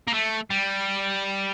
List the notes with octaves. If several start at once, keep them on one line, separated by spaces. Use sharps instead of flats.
A#3
A3
G3